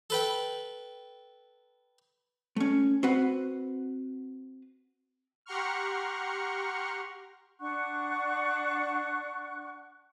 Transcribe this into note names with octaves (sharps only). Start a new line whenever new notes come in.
A4 B4 G5
A3 C#4
C4 F#4 B4 F#5
G4 F#5 A#5 C6 C#6 F6
D4 F#5 C#6 F#6